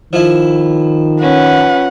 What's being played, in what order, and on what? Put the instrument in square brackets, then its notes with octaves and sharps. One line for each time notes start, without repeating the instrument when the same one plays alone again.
[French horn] D#3 [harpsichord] F3 E4
[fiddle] C#4 B4 [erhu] F#5